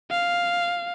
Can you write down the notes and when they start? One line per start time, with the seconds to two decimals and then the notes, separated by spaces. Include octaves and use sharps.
0.11 F5